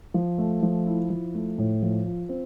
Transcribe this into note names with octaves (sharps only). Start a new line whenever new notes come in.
F3
A3
F3
E4
F3
A3
A2
F3
F4
C4